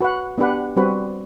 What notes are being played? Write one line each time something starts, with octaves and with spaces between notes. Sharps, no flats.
F#4 B4 F#5
B3 D4 G4 B4 F#5
G3 C4 F#4 B4